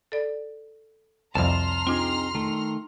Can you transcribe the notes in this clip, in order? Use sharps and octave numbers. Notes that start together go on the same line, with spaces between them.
A4 D5
C2 F2 A5 A#5 C6 F6
C4 D4 D#4 F4 G#4
D#3 A3